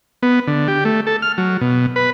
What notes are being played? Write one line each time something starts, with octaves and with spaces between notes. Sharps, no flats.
B3
D3
G4
A3
A4
F6
F#3
B2
B4